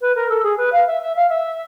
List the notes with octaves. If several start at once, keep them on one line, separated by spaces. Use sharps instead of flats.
B4
A#4
A4
G#4
B4
F5
E5
E5
F5
E5